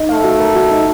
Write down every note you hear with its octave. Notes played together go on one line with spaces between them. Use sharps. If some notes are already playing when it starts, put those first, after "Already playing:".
Already playing: D#4
A3 F5
F#4
A#4
F#4
D#4